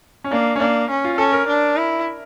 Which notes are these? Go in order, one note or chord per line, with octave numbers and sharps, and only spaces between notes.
C#4
A#3 D4
C#4
A#3 D4
C#4
F4
C#4 A4
A#4
D4
E4